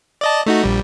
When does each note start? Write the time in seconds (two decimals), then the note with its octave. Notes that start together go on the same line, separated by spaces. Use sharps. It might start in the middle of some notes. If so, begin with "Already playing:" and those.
0.21 D5 D#5 A5
0.46 A3 D#4 F#4
0.64 A#1 G3